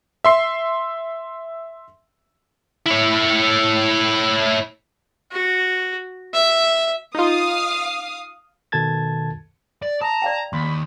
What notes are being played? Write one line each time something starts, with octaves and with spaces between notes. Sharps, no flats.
E5 C6 C7
E4 C#5
F#4
E5
D#4 F4 F5 D#6
B2 D#3 A4 A5 G#6 A6
D5
A5 A#5 D#6
D5 F5 G5
D#2 B5 C6